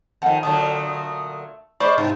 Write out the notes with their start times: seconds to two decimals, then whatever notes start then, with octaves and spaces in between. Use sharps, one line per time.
0.22 F2 D#3 F5 F#5 A5
0.43 A#2 D3 F#3 A3 A5 D#6
1.80 G#3 C#4 C5 D5 B5 C#6
1.98 G#2 B2 D#4 E4